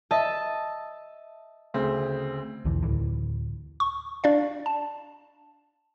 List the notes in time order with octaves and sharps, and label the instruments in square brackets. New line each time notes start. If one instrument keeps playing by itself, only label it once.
[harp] D#5 E5 A5
[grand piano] D2 C#3 C4
[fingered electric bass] B1 E2 D3 E3
D2 A2 D3 E3
[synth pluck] C#6
D4 D5 F5
A5